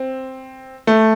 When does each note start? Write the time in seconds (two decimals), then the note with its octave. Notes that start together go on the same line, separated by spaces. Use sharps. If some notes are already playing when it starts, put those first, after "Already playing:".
Already playing: C4
0.87 A3